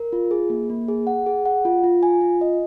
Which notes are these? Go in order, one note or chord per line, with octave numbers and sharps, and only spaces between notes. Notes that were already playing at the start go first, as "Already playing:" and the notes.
Already playing: A#4
F4
G#4
A#3
A#3
G#4
F#5
G#4
F#5
F4
F4
G#5
F4
D#5